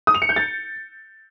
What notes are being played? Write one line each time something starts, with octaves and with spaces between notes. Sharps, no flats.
D#6
F7
C#7
G6
A6